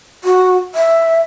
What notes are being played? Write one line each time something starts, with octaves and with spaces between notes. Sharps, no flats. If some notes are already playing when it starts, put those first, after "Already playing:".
F#4
E5